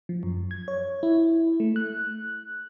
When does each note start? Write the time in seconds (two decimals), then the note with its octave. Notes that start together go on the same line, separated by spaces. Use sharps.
0.09 F3
0.23 F#2
0.51 G#6
0.68 C#5
1.03 E4
1.60 A3
1.76 F#6